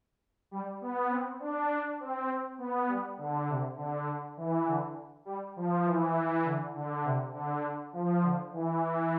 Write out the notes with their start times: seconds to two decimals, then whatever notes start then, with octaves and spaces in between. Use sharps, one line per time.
0.51 G3
0.81 B3
1.10 C4
1.40 D4
1.70 D4
2.00 C4
2.58 B3
2.88 G3
3.18 D3
3.48 C3
3.77 D3
4.37 E3
4.67 D3
5.25 G3
5.56 F3
5.86 E3
6.44 D3
6.75 D3
7.04 C3
7.34 D3
7.93 F3
8.22 D3
8.53 E3